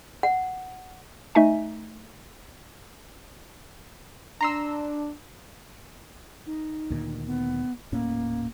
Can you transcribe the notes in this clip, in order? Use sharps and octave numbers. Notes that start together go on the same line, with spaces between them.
F#5
A3 D#4 D#5 E5 G#5
D4 A#5 C6 E6
D#4
D2 A#2 D#3
B3
D#1 A2 A#3 C#4